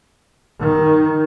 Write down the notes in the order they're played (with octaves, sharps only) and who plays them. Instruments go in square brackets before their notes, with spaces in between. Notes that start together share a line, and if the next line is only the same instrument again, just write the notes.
[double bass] D#3